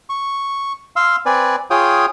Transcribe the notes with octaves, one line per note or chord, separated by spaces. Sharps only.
C#6
F5 C6 E6
C4 B4 D5 G#5
F4 G#4 C#5 G5 D#6